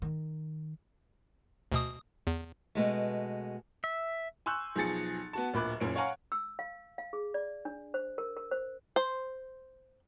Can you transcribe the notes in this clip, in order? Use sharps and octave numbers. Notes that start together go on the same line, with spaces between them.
D#3
D2 B2 D#6
E2
B2 G#3 A3
E5
G#5 C6 C#6 E6 F#6 G6
B1 F3 G#4 A6 C#7
B3 F#4 A5
D1 A#2 B5 D6 F#6
F#1 A#2 C#4 D7
C#5 F5 F#5 G#5 A#5 C#6
E6
F5
F5
G#4
D5
D4
C5
A#4
A#4
C5
C5